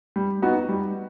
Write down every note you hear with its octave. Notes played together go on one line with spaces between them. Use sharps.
G3
B3 D#4 F#4
G3